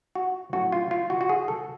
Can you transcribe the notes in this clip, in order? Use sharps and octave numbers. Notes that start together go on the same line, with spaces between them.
F#4
A2 F#3 C#4 F#4
F4
F4
F#4
F#4
G#4
A4